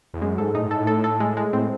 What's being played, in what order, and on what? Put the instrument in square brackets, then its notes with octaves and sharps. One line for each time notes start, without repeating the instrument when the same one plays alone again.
[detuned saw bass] E2
[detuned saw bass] F#2 [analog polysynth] G#3
[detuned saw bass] G#2 [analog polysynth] A4
[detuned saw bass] A2 [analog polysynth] D#4
[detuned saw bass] G#2
[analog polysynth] A4
[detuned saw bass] A2
[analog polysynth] A4
A4
G#3
G#3
[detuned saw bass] A2 [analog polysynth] C4